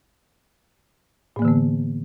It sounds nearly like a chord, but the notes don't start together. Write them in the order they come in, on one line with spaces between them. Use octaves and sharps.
A2 A#3 E3 D3 B3